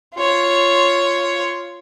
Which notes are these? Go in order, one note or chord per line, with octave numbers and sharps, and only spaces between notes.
F4 C#5